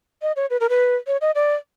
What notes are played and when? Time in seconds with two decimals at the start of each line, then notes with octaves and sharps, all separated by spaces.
0.22 D#5
0.36 C#5
0.50 B4
0.60 A#4
0.69 B4
1.07 C#5
1.21 D#5
1.35 D5